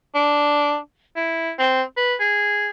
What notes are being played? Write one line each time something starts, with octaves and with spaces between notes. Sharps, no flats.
D4
E4
C4
B4
G#4